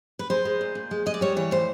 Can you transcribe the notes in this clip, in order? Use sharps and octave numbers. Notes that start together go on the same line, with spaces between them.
B4
G#3 C5
G#3
A#2
A#2
G#3
G#3 D#5
D5
G3 C#5
E3 C#5
A2 C5